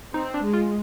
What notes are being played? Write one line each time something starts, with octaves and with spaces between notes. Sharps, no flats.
C4 D#4
D4
G#3
F4